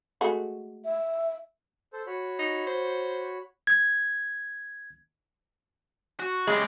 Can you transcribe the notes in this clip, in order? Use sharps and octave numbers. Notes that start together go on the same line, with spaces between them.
G#3 A3 F#4
E5
A4 C5
F#4 C#5 B5
D#4
C5
G#6
F#4
C#3 G#3 G4